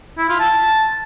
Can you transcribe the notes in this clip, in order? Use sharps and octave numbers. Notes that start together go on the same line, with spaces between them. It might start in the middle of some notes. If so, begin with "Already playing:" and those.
E4
F4
A5